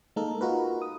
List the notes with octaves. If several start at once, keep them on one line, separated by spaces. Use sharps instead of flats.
G#3 A#3 D#4 A4 A#4
D#4 F4 F#4 A#4 B4
D#6